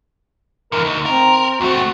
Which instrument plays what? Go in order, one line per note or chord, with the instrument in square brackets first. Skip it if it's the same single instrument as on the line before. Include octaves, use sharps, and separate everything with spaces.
[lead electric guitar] D3 E3 [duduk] A#4
[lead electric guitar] D2 [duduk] D#4
[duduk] C4 [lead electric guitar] A#4
[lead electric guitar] D2 A3 [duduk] F#4